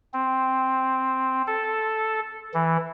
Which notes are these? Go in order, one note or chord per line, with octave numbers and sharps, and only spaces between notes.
C4
A4
E3